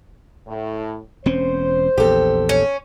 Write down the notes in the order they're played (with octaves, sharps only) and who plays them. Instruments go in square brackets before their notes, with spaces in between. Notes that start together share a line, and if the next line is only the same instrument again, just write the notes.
[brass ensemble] A2
[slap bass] E1 C4 C#4 [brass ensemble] C5
[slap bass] A#1 E2 [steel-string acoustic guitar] G4 A4
[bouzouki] C#4